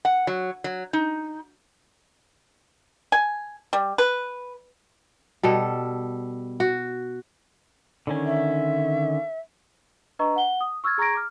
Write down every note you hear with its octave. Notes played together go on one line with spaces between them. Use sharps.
F#5
F#3
F#3
D#4
G#5
G3
B4
B2 G3 A4
F#4
D3 D#3 C#4
E5
D4 B4 D#5 A#5 C#6
F#5 G7
D#6
C#6 E6 F6 G#6 A6
G#4 A#5 C#6 G#6 A#6 D7
D6 F6